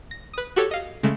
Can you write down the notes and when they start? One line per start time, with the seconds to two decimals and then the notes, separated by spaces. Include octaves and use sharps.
0.11 A#6
0.33 B4 D#6
0.56 F#4 G4 A4 C#5
0.71 D#5 F5
1.03 C#3 G#3 A3